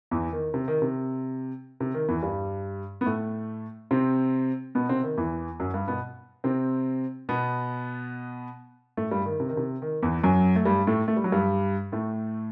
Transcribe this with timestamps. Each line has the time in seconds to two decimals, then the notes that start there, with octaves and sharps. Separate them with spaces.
0.11 E2 E3
0.32 D#3
0.54 C3
0.68 D#3
0.82 C3
1.80 C3
1.94 D#3
2.09 E2 E3
2.23 G2 G3
3.01 B3
3.06 A2 A3
3.91 C3 C4
4.75 B2 B3
4.89 C3 C4
5.03 D#3
5.17 E2 E3
5.60 F#2 F#3
5.74 G2 G3
5.88 B2 B3
6.44 C3 C4
7.29 B2 B3
8.97 A2 A3
9.11 G2 G3
9.25 D#3
9.40 C3
9.48 D#3
9.57 C3
9.82 D#3
10.02 E2 E3
10.24 F#2 F#3
10.56 A3
10.65 G2 G3
10.87 A2 A3
11.08 A3
11.17 G3
11.24 F#3
11.32 G2 G3
11.92 A2 A3